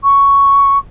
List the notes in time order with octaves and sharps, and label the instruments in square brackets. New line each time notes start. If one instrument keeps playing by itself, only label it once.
[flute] C#6